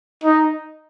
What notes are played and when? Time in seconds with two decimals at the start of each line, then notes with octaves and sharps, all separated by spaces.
0.24 D#4